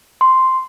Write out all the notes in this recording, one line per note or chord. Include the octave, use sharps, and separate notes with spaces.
C6